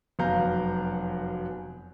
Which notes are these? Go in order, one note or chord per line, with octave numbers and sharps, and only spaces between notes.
F1 F#2 B3 F5 A#5 G6